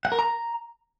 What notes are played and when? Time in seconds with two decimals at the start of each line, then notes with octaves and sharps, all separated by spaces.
0.05 F#5
0.12 A#4
0.19 A#5